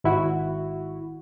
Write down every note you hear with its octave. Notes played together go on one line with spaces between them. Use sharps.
G#1 E4 F#4